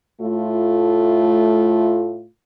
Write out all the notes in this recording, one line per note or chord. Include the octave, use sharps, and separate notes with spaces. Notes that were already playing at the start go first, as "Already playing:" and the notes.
A2 A3 F4